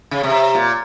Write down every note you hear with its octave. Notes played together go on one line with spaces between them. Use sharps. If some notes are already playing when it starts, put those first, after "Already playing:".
C#3
C3
A#2